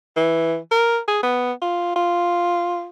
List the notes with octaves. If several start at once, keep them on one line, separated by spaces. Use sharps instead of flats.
E3
A#4
G#4
B3
F4
F4